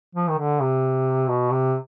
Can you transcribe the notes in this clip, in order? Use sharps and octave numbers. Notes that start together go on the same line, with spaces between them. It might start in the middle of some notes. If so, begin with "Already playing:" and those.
F3
D#3
D3
C3
B2
C3